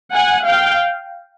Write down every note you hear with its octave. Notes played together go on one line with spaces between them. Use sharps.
F#5 G#5
F5 G5